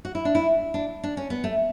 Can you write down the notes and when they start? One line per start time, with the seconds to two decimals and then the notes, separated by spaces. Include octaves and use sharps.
0.05 F#4
0.15 E4
0.25 D4
0.35 E4
0.74 D4
1.03 D4
1.17 C#4
1.30 B3
1.44 A3